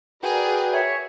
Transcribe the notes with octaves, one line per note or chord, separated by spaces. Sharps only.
F#4 G#4 A#4 B4 D5 G5
C#5 E5